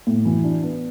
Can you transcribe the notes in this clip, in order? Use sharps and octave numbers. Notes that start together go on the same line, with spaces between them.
A2
E3
D4
B3